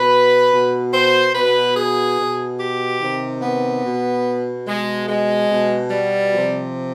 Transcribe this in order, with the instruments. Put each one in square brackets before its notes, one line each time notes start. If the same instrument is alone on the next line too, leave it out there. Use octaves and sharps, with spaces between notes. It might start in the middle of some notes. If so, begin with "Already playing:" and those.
Already playing: [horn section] B2 B4
B2
C5
B2 B4
G#4
B2
G4
C3 D#3
B3
B2
B2 G#3
G#3
B2
G3
C3 F3